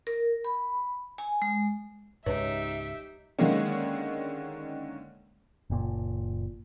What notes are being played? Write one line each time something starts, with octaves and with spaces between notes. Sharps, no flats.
A#4
B5
G#5
G#3
C#2 G#2 D#4 G4 B4 C#5 E5
D3 D#3 G#3 A#3 C#4
F#1 A#2